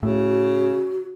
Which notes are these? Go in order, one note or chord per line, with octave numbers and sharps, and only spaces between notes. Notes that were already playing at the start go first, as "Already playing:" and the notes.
A2 C#3 F#4